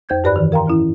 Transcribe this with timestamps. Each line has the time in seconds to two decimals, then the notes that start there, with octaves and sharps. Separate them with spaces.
0.09 F2 C5 G6 G#6
0.24 G2 G4 B4 D5 B5 F#6
0.36 D#3 E3
0.52 A#4 F5 G5 A#5 C6
0.66 A2 E3 C#4 E4